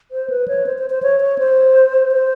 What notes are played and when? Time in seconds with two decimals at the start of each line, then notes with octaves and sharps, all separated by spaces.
0.11 C5
0.30 B4
0.48 C#5
0.66 C5
0.78 C5
0.90 C5
1.03 C#5
1.21 C#5
1.38 C5
2.12 C5